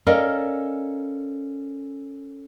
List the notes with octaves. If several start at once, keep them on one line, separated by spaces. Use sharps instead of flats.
C#4 A4 A#4 D5 D#5 F5